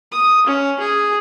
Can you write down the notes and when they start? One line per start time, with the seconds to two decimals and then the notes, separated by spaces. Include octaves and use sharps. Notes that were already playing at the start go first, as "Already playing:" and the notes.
0.12 D#6
0.47 C#4
0.80 G#4